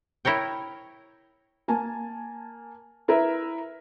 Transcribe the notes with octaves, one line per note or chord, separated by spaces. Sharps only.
E4 A#4 C#5 G5
A#3 G#5 A5
E4 A#4 B4 E5